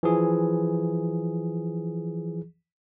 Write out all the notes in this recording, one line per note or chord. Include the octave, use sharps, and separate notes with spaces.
E3 F3 G#4